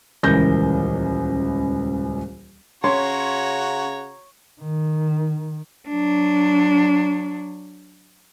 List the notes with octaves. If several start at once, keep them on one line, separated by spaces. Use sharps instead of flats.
D#1 C#2 E3 A#4 G6 A#6
C#3 C#4 F#4 C#5 A#5 C6
D#3
F#3 D4